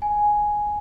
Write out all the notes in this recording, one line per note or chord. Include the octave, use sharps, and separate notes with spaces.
G#5